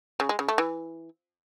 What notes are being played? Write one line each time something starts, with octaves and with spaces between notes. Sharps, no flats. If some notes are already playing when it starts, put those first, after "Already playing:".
C#3
G#3
C#3
A3
E3